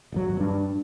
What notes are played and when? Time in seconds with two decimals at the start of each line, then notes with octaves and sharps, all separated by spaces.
0.12 D#1 G#1 F#3
0.37 G2 D4